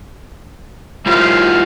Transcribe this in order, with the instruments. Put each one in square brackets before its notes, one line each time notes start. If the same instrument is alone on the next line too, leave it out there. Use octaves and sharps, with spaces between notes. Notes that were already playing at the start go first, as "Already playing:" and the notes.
[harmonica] D#3 E4 F5 [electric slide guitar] G3 F4 C5